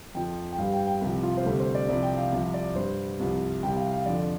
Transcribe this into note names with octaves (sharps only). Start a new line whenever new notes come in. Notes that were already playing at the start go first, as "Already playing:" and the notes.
F2 F3 G5
G5
G2 G3 F5
G5
G5
C2 C3 F3 G4
F4
C5
D2 C3 G3 A4
C5
D5
C2 C3 F3 D5
G5
F5
C2 C3 F3
D5
G2 G3 C5
C2 C3 F3
C2 C3 G3 G5
F5
F5
F2 D3 F3 D5